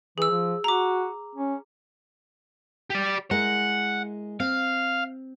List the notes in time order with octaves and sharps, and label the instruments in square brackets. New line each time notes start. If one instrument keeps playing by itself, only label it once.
[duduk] E3 [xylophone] G#4 E6
[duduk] F3
[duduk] F#4 [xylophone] A#5 D6
[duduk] C#4
[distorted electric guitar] G4 D5
[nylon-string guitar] G#3 E4 A#4 [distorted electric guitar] F#5
[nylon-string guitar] C4 [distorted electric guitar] F5